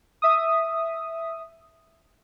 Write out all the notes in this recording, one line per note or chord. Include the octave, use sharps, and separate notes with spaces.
E5 D#6